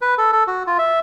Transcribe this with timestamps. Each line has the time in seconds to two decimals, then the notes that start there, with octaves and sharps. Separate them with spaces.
0.01 B4
0.18 A4
0.32 A4
0.47 F#4
0.67 F4
0.78 E5